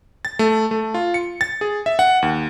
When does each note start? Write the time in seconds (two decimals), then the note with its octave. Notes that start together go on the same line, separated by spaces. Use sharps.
0.25 A6
0.39 A3
0.71 A3
0.94 F4
1.14 C#7
1.41 A6
1.61 G#4
1.86 E5
1.99 F#5
2.22 D#2